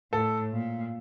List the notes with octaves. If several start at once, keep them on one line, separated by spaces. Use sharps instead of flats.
A2 A4
A#2